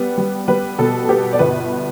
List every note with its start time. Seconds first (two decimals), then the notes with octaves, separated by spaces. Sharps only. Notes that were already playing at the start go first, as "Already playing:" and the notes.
Already playing: G3 B3 B4
0.18 G3
0.48 G3 B4
0.79 B2 A4
1.09 B3 G4
1.33 D5
1.39 G1 B4